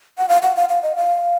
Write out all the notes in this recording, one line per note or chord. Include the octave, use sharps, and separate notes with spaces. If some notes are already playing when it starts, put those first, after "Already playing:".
F#5
F5
F#5
F5
F5
D#5
F5